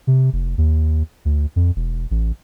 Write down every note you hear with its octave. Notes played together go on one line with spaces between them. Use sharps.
C3
F1
D#2
D2
F2
E1
A1